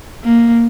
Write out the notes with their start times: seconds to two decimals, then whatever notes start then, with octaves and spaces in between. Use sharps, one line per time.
0.24 A#3